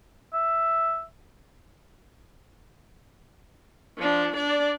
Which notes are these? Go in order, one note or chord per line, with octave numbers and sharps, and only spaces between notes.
E5
F3 D4
D4 D5